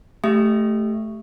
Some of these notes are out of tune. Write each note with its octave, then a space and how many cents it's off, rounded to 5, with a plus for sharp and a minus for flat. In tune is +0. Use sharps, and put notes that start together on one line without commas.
A3 -5 G4 +0 E5 +15